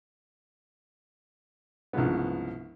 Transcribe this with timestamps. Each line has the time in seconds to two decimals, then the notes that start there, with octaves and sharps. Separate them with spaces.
1.93 C2 G2 C#3 F3 G#3 B3